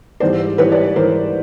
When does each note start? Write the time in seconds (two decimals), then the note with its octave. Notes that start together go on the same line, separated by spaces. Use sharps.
0.20 G#2 E3 G3 C5 D5
0.58 G#2 E3 G3 B4 C#5
0.72 D5
0.84 C#5
0.96 G#2 E3 G3 A#4 C5